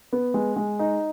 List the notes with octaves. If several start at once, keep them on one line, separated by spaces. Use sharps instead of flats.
B3
G#3
G#3
D#4